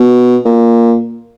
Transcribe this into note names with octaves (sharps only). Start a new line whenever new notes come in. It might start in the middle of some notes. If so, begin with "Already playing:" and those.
Already playing: B2
A#2